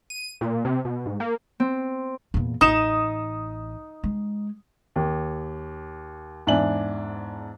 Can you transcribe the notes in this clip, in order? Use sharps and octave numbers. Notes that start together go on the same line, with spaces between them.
D#7
A#2
C3
B2
G#2
A#3
C4
E2 A#2
A1 D#4 D#6 E7
G#3
D#2
E2 G#2 D4 E5 G#5 F#7